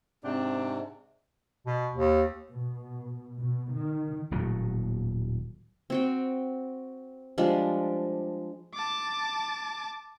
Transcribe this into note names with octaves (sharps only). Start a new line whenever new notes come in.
G#2 C3 C4 D4
B2
D#2
B2
B2
D#3
D#1 D#2 A2 F#3
C4 F#4 G5
F3 G3 G#3 D4
A5 D6